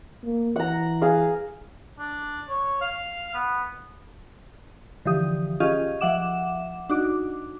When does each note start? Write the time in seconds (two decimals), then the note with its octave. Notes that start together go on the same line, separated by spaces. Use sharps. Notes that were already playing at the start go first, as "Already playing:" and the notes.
0.24 A#3
0.56 E3 F#5 A#5
1.02 G#4 F5
1.99 D4
2.49 C#5
2.81 F5
3.34 B3
5.05 D3 E3 F3 G4 D#6
5.60 C#4 F4 G4 G#4 D#5 F5
6.01 F3 E5 F#5 D6 E7
6.89 D4 D#4 F#4 D6